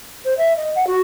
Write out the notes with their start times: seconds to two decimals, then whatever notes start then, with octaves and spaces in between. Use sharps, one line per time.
0.25 C5
0.38 E5
0.57 D#5
0.75 F#5
0.87 F#4